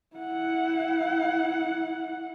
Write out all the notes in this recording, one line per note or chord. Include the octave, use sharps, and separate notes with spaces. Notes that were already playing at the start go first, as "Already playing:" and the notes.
E4 F#5